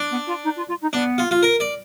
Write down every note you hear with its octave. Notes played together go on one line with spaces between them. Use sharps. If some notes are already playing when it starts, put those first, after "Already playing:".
Already playing: D4
B3
F4
D#4
F4
F4
D#4
B3 D4
F4
F4
A#4
D5